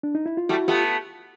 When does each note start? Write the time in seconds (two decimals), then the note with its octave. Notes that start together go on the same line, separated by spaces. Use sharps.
0.03 D4
0.15 D#4
0.26 E4
0.37 F4
0.49 G3 A3 E4 F#4
0.68 A3 B3 F4 G4